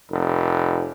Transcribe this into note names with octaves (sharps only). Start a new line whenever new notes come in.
F1